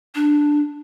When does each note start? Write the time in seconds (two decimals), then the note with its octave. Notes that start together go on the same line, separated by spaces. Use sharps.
0.15 D4